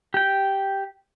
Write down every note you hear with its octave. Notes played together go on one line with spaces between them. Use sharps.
G4 G5